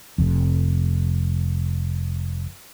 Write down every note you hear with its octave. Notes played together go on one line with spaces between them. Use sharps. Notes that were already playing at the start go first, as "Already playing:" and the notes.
F1 F2